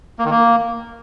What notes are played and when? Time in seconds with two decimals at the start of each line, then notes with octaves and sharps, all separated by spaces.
0.19 A#3
0.25 D#3
0.31 A#3